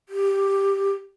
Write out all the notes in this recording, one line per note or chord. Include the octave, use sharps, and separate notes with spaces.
G4